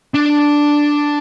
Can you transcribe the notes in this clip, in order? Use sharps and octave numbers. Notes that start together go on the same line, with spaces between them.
D4